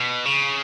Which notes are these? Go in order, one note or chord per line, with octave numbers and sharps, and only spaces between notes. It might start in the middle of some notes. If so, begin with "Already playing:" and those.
Already playing: B2
C#3